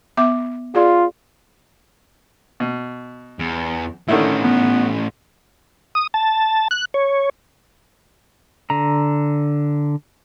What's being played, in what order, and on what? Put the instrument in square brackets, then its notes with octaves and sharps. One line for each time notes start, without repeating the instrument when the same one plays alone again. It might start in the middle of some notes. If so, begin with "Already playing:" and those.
[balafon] B3 E5 D6
[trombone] F4 [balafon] G#4 D5
[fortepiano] B2
[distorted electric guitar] E2
[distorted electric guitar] A2 C#4 [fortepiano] D3 D#3 E4
[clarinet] B3
[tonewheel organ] D#6
A5
F#6
C#5
[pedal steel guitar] D3 A#5